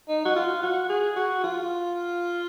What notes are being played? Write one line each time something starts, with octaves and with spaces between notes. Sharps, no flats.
D#4
F#4
F4
F#4
G#4
F#4
F4